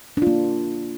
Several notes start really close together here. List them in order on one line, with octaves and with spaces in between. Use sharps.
D4 F4 A#3